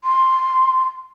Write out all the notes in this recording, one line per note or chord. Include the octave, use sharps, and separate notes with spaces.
C6